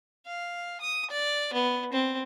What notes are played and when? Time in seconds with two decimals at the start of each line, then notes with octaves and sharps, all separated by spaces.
0.26 F5
0.81 D#6
1.11 D5
1.54 B3
1.93 C4